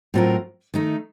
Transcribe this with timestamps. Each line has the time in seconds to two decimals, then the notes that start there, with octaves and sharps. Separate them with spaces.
0.14 A2 F#3 C4 F4 A#4
0.74 D#3 A3 D#4